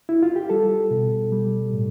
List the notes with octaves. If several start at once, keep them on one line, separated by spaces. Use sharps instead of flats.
E4
F4
G4
G3 A4
B2
G3
A2